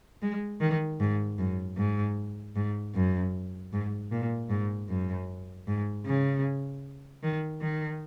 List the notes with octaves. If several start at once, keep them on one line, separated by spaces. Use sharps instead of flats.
G#3
D#3
G#2
F#2
G#2
G#2
F#2
G#2
A#2
G#2
F#2
G#2
C#3
D#3
D#3